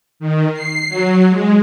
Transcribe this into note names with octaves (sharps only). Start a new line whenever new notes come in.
D#3
C7
F#3
G#3